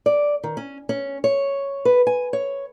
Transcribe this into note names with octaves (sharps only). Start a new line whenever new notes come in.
D5
D#3
C#4
C#4
C#5
B4
G#5
C#5